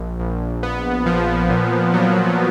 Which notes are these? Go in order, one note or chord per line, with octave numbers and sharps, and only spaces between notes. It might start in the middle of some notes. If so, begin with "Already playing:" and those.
Already playing: A#1
A#1
B3
F3
A#2
F#3